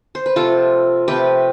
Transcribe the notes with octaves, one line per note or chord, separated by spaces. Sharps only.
C5
B4
C3 F3 A3 F4 A4
C3 F3 A3 G4 B4